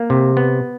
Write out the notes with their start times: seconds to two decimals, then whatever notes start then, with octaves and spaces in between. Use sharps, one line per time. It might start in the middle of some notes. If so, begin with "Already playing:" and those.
Already playing: A#3
0.10 C3
0.37 B3